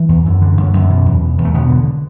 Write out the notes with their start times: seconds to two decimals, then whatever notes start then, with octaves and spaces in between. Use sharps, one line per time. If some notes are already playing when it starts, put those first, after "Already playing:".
Already playing: E3
0.09 E2
0.25 F#2
0.41 D3
0.57 F#2
0.73 F#2
0.89 B2
1.06 E2
1.21 B2
1.38 E2
1.45 A3
1.54 B2 D3 B3
1.70 D3